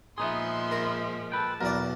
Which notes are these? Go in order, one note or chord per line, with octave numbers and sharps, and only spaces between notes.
A#2 F3 G#3 B3 D#4 G#4 E5 C6
A#4
A4 B4 G5 A5
B1 E2 A#4 B4 D5